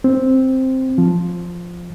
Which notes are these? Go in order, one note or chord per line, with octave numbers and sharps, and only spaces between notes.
C4
F3